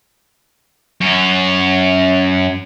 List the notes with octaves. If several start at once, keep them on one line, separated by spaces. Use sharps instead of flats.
F#2 C#4